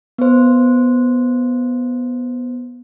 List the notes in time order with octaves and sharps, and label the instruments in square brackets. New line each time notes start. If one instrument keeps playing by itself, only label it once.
[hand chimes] B3 C5